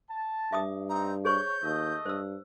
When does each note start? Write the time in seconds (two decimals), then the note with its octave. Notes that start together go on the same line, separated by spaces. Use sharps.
0.10 A5
0.52 G2 E5 D6 D#6
0.89 C4 D#4 A#5
1.25 G#4 C5 C#5 C#6 G6
1.63 D#2 A3 D#5
2.06 G2 C5 E6